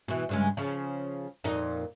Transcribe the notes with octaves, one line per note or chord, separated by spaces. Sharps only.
B2 E3
G2 C#3 G#3
C#3 F3
F2 A#2 D#4